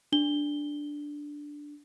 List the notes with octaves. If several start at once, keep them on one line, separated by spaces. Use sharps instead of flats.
D4 G7